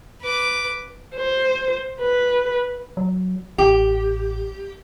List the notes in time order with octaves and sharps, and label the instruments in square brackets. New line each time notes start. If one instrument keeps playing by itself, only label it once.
[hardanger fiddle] B4 D6
[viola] C5
B4
[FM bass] F#3
[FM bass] A1 [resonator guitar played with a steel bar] G4